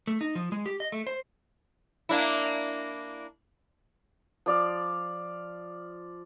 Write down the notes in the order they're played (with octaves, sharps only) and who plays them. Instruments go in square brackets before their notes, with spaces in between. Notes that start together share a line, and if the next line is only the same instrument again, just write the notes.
[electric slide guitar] A3
D#4
F3
G#3
G4
D#5
A3
C5
[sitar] A#3 D4 E4
[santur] F3 D5 F5